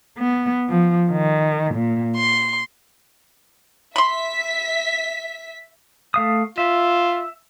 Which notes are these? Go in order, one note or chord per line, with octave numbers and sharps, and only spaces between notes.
B3
F3
D#3
A#2
C6
E5 B5 C6 B6
A3 F5 D#6
F4 E5